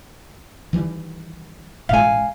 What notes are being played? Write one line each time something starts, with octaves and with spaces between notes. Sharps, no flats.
D#3 E3 G3
A1 B2 G#3 F5 G#5